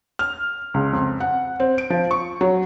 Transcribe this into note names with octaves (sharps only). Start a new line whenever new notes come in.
F6
C#2
F2
F#5
C4
D7
F3
C#6
F#3